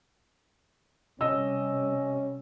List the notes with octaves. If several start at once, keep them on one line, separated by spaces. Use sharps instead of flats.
C3 G3 C#4 D#5 E6